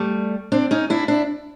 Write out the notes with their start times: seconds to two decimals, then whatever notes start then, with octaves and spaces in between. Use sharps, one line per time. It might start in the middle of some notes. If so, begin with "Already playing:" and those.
Already playing: G3 A3
0.52 C4 D4
0.71 C#4 D#4
0.90 D4 E4
1.08 D4 E4